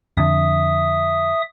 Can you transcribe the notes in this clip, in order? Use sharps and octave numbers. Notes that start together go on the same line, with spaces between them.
F2 D3 E5 D#6